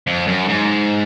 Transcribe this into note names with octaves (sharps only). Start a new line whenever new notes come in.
F2
F#2
G#2